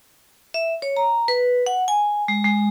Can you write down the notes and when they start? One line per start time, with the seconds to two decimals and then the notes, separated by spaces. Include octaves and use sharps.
0.54 E5
0.82 C#5
0.97 A#5
1.28 B4
1.66 F#5
1.88 G#5
2.28 G#3
2.44 G#3